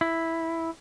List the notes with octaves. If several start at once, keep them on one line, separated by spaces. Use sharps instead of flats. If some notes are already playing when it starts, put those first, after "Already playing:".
E4